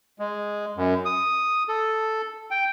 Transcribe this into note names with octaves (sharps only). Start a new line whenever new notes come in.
G#3
F#2
D#6
A4
G5